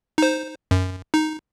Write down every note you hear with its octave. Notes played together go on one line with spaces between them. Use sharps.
D#4 C5
F#2
D#4